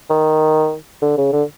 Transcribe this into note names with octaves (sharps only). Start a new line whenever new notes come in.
D#3
D3
C#3
D3